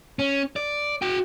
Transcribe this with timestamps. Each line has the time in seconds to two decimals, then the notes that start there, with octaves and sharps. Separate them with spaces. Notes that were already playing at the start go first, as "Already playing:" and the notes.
0.19 C#4
0.56 D5
1.02 F#4 G5